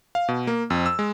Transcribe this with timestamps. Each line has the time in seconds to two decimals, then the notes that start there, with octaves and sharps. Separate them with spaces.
0.15 F5
0.29 B2
0.47 A#3
0.70 F2
0.86 E6
0.99 G#3